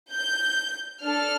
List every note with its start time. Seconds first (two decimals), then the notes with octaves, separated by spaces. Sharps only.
0.10 G6
1.02 D4 A4 F6